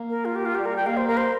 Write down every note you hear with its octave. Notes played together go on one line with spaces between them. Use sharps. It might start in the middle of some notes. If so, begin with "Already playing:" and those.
Already playing: A#3
A#4
F4
G4
F4
G3 G4
A#4
G5
A#3 F5
C5
A#4
C5